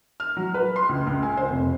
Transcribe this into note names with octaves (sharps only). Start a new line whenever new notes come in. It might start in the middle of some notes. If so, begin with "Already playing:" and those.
F6
F#3
B4
C6
C#2
C#2
G#5
C5
F1